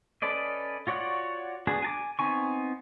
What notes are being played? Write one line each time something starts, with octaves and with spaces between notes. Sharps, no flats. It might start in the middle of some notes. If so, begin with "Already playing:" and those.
C#4 A4 B4 D5 D#5
F4 F#4 C#5 D5 F#5
B3 D4 F#4 G#4
G#5 A5 D6
B3 C4 D#4 G#5 C#6